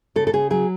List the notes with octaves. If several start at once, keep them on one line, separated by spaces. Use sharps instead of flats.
C#3 A4
A4
C#3 G#4
F#3 G#4